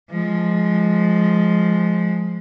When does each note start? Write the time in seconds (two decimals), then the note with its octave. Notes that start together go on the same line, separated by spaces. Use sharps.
0.11 F3 G#3